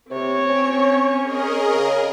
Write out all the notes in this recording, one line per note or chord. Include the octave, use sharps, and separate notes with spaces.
C3 C4 C#5
C#4
G#4 A#4 D#5
C#3